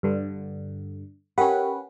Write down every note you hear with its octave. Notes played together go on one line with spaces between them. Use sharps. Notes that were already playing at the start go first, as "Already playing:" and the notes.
G2 D3
C#4 G4 A#4 B4 F#5 G5